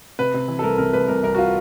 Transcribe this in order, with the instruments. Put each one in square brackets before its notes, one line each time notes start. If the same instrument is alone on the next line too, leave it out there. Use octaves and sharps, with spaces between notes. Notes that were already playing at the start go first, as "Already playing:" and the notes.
[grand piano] C3 B4
C3
E3
A4
C2 A#4
C3 A#4
C2 B4
C2 A#4
C2 A#4
F#4
F4